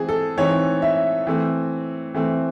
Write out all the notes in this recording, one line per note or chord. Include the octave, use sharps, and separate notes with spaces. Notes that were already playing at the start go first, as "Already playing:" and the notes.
Already playing: E3 G#3 C4 G#4
A4
E3 G#3 C4 D#4 C#5
E5
E3 A3 C4
E3 A3 C4